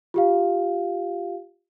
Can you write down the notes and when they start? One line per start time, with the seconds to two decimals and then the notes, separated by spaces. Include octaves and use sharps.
0.14 F4 G4 F5